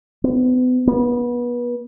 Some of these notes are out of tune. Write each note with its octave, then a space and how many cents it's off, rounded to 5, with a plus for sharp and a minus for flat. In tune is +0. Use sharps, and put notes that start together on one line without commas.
B3 +35
B3 -30